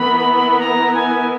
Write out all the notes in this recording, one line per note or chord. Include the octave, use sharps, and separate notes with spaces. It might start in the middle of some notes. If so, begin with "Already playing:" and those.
Already playing: E3 B3 E4 A#4 B5
A#5
G#5